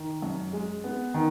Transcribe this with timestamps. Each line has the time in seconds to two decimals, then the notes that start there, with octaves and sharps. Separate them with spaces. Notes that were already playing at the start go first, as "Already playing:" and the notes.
Already playing: D#3
0.22 F#2
0.53 G#3
0.84 B3
1.14 D#3